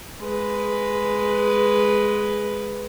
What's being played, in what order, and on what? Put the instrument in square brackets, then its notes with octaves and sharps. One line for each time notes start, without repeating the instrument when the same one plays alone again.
[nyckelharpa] G#3 B4